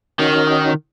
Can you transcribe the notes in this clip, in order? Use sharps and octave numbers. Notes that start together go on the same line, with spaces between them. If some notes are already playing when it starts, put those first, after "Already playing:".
D#3 C#4 D#4 F#4